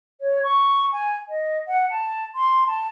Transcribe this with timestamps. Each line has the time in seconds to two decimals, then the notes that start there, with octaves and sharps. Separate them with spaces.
0.21 C#5
0.43 C#6
0.92 G#5
1.29 D#5
1.68 F#5
1.90 A5
2.35 C6
2.67 A5